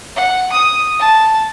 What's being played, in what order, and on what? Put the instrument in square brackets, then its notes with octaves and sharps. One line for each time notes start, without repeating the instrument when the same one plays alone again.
[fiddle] F#5
D#6
A5